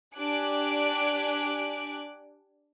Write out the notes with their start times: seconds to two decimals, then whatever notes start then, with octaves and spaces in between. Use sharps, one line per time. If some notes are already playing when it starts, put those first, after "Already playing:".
0.15 D4 G4 G#5 D6 F#6 D7